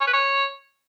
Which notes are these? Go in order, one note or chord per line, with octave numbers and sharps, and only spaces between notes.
C#5
B4
C#5